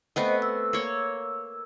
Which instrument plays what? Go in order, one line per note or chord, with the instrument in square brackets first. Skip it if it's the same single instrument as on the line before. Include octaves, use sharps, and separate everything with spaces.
[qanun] A3 B3 C4 [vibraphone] C5 D#5
[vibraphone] E6
[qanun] A#3 C#5